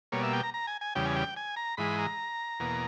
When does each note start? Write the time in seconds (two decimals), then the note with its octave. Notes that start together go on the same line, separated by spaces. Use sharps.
0.12 B2 G3 A#3 C#5
0.23 E5
0.33 G5
0.43 A#5
0.54 A#5
0.67 G#5
0.81 G#5
0.95 E2 C#3 G3 G5
1.05 G#5
1.16 G5
1.36 G#5
1.56 A#5
1.77 G#2 E3 G#3 B5
1.98 A#5
2.60 E2 B2 A#3